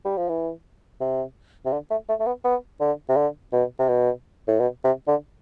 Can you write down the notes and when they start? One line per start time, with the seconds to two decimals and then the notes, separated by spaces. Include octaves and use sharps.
0.05 G3
0.17 F3
0.29 E3
1.00 C3
1.65 C3
1.72 D3
1.90 A3
2.09 A3
2.19 A3
2.26 B3
2.44 B3
2.80 D3
3.09 C3
3.16 D3
3.52 B2
3.79 C3
3.88 B2
4.48 A2
4.60 B2
4.84 C3
5.07 D3